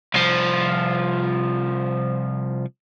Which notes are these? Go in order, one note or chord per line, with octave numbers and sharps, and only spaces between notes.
C2 F3